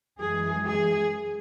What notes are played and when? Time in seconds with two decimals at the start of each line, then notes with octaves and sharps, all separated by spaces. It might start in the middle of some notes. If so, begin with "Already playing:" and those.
0.20 F#2 E3 G#3 G#4
0.68 G#4